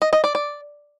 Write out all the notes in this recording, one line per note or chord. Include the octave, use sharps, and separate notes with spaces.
D#5
D#5
D5
D5